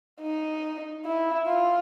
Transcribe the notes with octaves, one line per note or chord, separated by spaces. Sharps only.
D#4
E4
F4